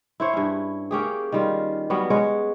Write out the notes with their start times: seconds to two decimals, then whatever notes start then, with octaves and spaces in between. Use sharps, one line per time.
0.20 E4 C5 C#5
0.33 G2 C#4
0.91 A#3 C#4 G4 G#4
1.32 D#3 G3 F4
1.90 F#3 G3 B3 C#4
2.10 G#3 C#4 B4 C#5